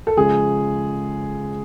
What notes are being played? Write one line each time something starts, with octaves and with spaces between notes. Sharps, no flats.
A4
C#3 F3 G#3 G#4